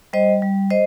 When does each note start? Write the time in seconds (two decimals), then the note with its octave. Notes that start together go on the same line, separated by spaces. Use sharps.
0.13 G3 C5 D#5
0.42 G3
0.70 C5 D#5